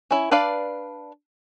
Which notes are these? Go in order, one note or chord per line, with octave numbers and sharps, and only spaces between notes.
C#4 E4
D4 B4 D5 F5